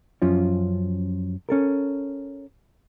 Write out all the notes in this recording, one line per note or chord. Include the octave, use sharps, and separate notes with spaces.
F#2 F3 C#4 F4
C#4 A4 A#4